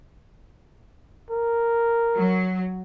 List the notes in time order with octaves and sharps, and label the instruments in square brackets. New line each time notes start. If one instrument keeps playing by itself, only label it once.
[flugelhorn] A#4
[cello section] F#3